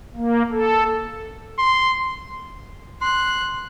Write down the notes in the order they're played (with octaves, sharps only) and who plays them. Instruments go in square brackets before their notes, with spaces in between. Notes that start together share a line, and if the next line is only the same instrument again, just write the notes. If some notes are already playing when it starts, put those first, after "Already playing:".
[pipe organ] A#3
A4
[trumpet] C6
[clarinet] C6 [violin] F#6